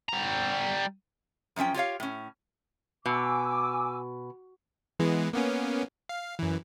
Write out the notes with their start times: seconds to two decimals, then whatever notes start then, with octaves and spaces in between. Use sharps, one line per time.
0.09 G3 A#5
1.56 F#2 A2 F3 C#4 G5
1.74 F4 G4 C#5 F5
2.00 A2 C#4
3.06 B2 G#5 D6 E6
4.99 E3 G#3 B3
5.33 A#3 B3 C#4
6.09 F5
6.39 F#2 E3